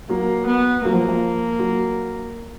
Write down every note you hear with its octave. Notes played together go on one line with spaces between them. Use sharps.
F#3 A#3
B3
F#3 A#3
F3
F3
F#3